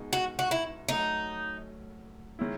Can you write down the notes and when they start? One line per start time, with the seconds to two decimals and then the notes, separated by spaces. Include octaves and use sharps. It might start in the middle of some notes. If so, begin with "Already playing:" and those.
Already playing: B2 G#3 B3 D#4
0.13 F#4
0.39 F#4
0.51 E4
0.88 F#3 A3 C#4 D#4 F#4
2.39 D#3 G#3 C#4 E4